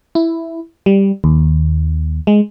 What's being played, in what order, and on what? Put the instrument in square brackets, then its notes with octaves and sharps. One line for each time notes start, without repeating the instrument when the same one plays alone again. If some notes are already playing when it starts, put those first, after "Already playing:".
[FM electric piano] E4
G3
D#2
G#3